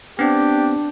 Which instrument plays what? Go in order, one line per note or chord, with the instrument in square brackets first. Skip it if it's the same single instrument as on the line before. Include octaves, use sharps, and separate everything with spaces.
[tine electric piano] B3 C4 [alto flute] D4 [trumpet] G4